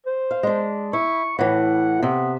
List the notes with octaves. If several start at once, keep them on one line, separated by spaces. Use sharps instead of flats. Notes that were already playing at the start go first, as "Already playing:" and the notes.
C5
F5
G#3 D4
E4 C#6
A2 E3 F#5
C3 B3 E5